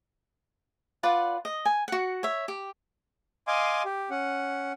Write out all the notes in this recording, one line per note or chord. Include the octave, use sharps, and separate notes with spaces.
F4 B4 D5 F#5
D#5
G#5
F#4 F#5
C#5 E5
G4
D#5 F5 G#5 C6 D6
G4
C#4 F#5